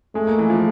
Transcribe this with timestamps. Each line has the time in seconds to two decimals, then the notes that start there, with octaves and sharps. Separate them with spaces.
0.15 G#3 A3
0.27 A#3
0.38 E3
0.50 F3